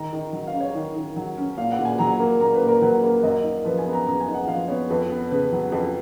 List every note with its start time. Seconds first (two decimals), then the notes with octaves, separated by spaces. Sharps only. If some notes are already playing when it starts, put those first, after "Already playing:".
Already playing: D#3 A#5
0.13 D#3
0.33 F#3
0.47 F5
0.53 C#4
0.61 C#5
0.75 D#3
0.96 D#3
1.16 F#3
1.37 C#4
1.57 A#2 F5
1.72 F#5
1.79 A#2
1.85 G#5
1.99 F#3 A#5
2.19 A#3
2.40 A#2 A#5
2.54 B4
2.62 A#2
2.68 A#4
2.82 F#3 B4
3.03 A#3
3.23 F#2 D#5
3.44 D#4
3.65 F3 B4
3.78 G#5
3.86 B3
3.93 A#5
4.07 F#2 A#5
4.21 G#5
4.28 D#4
4.34 F#5
4.47 F3 F5
4.68 B3 C#5
4.90 F2 B4
5.10 B3
5.31 C#3 B4
5.52 F#3
5.72 F2 B4